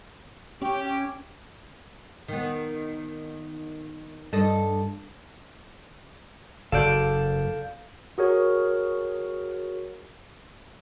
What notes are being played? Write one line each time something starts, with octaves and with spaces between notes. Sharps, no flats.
C#4 G4
D#3 B3
G2 A4 D#5
F#1 A4 D5 F5 G6
F#4 G#4 A#4 C#5